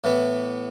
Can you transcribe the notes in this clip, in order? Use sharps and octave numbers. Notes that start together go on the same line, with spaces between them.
A2 E3 B3